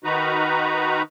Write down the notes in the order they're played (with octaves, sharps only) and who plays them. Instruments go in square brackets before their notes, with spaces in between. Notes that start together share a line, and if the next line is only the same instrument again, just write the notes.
[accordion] D#3 D#4 F#4 B4 A#5